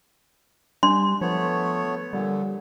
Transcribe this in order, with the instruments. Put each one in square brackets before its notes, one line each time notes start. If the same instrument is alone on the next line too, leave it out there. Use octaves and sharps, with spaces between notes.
[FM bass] G3 [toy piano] D4 C6
[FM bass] F3 [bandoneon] A3 B3 C#5
[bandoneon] A#2 D3 [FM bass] G3